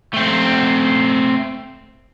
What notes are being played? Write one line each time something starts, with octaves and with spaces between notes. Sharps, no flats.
A3 C4